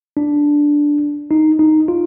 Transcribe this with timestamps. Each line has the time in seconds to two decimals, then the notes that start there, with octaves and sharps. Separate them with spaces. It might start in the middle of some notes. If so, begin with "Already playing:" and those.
0.17 D4
1.31 D#4
1.59 D#4
1.88 F4